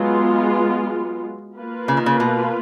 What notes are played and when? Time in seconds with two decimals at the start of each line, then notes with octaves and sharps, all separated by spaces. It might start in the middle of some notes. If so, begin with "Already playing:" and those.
Already playing: F#3 G#3 B3 F4
1.56 A#3 F4 B4
1.88 C#3
1.97 D#3
2.06 C#3
2.20 B2